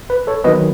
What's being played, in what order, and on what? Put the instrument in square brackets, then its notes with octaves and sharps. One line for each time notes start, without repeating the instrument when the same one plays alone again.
[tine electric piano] B4
A4 C#5
D#3 F#3 B3 B4 D#5